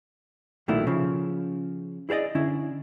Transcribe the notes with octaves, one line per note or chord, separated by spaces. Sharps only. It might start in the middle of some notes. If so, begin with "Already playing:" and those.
B1 A#2 D#3 F#3 A3 E4
C#3 F3
E4 G#4 C5 D5 D#5
D3 C#4 E4